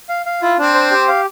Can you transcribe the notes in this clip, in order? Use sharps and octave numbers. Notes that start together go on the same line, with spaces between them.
F5
F5
E4 F4
C4 D4
C5
G4
F5